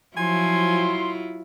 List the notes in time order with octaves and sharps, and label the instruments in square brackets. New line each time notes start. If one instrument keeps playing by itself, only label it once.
[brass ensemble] F3 [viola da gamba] F#3 E4 F4 [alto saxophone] G#5 [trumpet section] C6